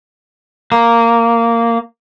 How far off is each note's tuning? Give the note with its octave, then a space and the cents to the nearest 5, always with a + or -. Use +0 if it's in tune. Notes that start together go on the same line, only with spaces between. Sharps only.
A#3 -10